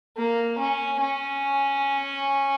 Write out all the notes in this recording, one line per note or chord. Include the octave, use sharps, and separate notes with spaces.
A#3
C#4
C#4